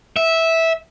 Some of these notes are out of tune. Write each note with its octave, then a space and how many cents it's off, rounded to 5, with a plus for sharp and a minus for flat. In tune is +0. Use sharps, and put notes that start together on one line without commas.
E5 -10